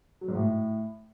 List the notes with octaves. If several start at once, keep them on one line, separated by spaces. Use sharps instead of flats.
F#3
G#2
A2